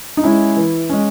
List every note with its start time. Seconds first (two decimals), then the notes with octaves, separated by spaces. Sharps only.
0.17 D#4
0.23 G#3 C#4 E4
0.57 E3
0.89 G#3 C#4